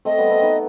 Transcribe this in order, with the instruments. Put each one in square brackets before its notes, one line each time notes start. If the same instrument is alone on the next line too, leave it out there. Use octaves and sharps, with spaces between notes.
[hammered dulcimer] A3 C4 [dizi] D#5
[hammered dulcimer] G3 B3
A3 C4
B3 D#4